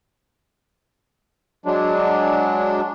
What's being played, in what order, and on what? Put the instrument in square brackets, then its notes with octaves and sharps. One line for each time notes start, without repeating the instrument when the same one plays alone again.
[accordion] F#3 G#3 D4